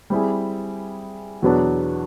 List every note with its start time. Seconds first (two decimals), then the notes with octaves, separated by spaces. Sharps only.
0.10 G3 C4 E4 G#4
1.42 E2 B2 F#3 B3 D4